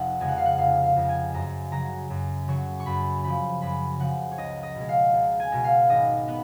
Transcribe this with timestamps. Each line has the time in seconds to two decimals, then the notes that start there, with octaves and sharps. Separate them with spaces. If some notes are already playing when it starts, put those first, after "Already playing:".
Already playing: F1 F#5
0.20 F2 C#3 G#3 G#5
0.28 F#5
0.38 F5
0.45 F#5
0.58 F1 F5
0.83 F5
0.96 F2 C#3 G#3
1.09 G#5
1.34 F#2 A#5
1.72 C#3 F#3 A#5
2.10 F#2
2.48 C#3 F#3 C#6
2.80 C#6
2.86 F#2 B5
3.24 C#3 F3 B5
3.62 F#2 B5
3.99 C#3 F3 F#5
4.32 C#5
4.38 C#2 D#5
4.63 D#5
4.76 B2 G#3
4.89 F5
5.13 C#2
5.40 G#5
5.52 B2 G#3
5.64 F5
5.90 G#1 D#5
6.28 B3 B4